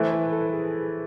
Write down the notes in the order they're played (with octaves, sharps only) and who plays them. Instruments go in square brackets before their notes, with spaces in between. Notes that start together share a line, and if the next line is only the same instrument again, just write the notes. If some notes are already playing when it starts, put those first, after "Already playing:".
Already playing: [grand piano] E3 A3 E4 [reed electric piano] C5
[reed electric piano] B4
A4
G#4